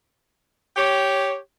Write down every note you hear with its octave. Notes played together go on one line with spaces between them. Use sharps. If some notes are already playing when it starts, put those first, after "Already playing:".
G4 C#5